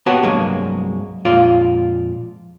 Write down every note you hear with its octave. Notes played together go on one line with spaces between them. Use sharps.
B3 F#4 G4 C#5 F#5 A5
C2 G2 F#3 G#3 A#3
F2 A#2 G#3 F4 D5